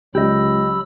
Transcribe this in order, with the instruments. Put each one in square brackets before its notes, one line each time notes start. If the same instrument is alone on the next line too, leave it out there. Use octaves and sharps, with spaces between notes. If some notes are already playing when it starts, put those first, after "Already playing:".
[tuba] C#2 [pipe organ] F#3 B5 E6 [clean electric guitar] G4 D#5